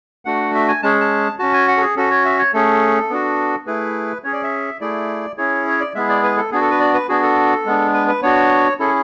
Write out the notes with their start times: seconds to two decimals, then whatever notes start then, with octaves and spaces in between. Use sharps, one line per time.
0.25 A3 D4 F#4 F#5
0.55 E5
0.68 G#5
0.83 G#3 C#4 G#4 A5
1.01 A5
1.39 C#4 F#4 A5
1.53 G#5
1.68 F#5
1.77 A4
1.82 G#4
1.96 C#4 F#4 A4
2.10 C#5
2.25 E5
2.39 C#5
2.53 A3 C#4 G#4 A4
3.10 B3 D4 F#4
3.66 A3 E4 G#4 B4
4.24 C#4 G#4 C#5
4.33 D5
4.43 E5
4.81 A3 E4 G#4 D5
5.38 C#4 E4 G#4 C#5
5.67 C#5
5.80 D5
5.95 G#3 B3 E4 G#4 E5
6.09 D5
6.23 B4
6.37 A4
6.51 B3 D4 F#4 G#4
6.61 A4
6.71 B4
6.80 D5
6.94 B4
7.09 B3 D4 F#4 G#4
7.23 A4
7.66 G#3 B3 D4
7.94 B4
8.08 B4
8.22 B3 D4 F#4 C#5
8.79 C#4 E4 G#4 A4